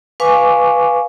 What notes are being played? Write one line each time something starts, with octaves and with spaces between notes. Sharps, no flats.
B4 F5 G#5 C#6 D6